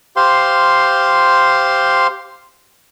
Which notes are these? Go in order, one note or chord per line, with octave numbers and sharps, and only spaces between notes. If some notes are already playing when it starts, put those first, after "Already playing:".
G4 C5 F5 C6